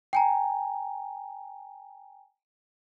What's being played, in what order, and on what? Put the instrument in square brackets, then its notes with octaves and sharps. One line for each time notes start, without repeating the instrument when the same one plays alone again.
[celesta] G5 G#5 A#5